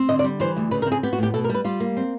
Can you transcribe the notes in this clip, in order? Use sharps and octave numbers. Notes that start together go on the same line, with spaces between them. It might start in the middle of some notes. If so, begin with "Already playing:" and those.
Already playing: C4
D3 D#5
D5
G3
E3 C5
D2
C#3 B4
A#4
C4
G#4
B3 G4
F#4
A2 G4
B2 A4
A#4
G3
B4
G3 F4
A#3
C4